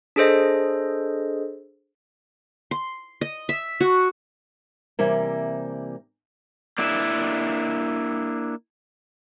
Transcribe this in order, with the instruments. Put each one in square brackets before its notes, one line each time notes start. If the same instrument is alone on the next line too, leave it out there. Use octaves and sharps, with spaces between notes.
[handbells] D4 G#4 A4 C5 D#5
[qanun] C6
D#5
E5
F#4
[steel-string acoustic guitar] C3 E3 G3 A#3
[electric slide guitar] A#3 D4 E4